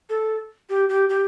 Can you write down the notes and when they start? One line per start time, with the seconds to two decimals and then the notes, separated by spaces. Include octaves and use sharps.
0.09 A4
0.69 G4
0.89 G4
1.09 G4